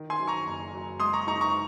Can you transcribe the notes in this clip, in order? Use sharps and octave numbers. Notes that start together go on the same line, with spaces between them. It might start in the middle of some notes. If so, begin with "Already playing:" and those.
Already playing: D#3
G#5 C6
F#3
A#5 C#6
F#1
F#3
G#3 C6 D#6
A#5 C#6
D#4 A#5 C#6
A#5 C#6